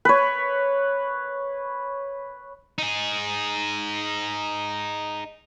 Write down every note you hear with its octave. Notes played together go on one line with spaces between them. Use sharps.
B4 C#5
D#4 G#4